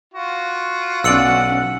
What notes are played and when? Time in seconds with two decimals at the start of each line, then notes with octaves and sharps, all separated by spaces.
0.14 F4 F#4
1.04 B1 C#4 D5 F#5 E6 C#7 F#7